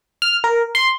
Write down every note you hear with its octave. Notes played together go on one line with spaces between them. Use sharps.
F6
A#4
C6